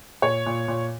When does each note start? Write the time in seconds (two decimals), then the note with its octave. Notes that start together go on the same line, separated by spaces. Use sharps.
0.22 A#2 C#5
0.46 A#2
0.68 A#2